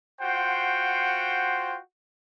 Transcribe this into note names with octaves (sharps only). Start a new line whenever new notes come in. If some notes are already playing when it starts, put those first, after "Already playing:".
F4 F#4 C5 F#5 G5